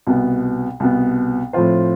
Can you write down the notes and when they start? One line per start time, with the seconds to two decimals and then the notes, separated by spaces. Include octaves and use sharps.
0.07 C2 B2 B3
0.80 C2 B2 B3
1.53 A2 F3 C4 F4 C5